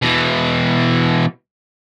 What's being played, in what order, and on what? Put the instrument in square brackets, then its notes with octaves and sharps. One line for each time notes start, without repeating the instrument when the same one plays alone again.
[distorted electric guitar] B2 E3